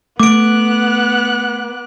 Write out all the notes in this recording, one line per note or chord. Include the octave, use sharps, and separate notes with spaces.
A3 B3 D6 F#6 D7